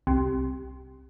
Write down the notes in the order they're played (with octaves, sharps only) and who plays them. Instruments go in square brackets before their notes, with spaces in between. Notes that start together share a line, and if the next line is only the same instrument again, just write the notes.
[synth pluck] C2